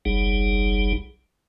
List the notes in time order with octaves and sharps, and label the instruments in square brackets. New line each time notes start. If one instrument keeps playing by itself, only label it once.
[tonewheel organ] F#1 B1 G3 D#4 G#4